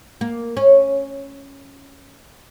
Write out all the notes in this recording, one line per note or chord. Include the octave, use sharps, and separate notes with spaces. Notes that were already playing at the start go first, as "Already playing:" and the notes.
A#3
C#4